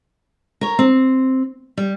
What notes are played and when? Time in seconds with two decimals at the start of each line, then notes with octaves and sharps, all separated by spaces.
0.61 A#4 C#5
0.79 C4
1.78 G3